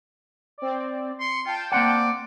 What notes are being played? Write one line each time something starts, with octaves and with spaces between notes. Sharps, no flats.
C4 D5
C6 C#7
F4 G5 A5
A#3 C4 D5 F#5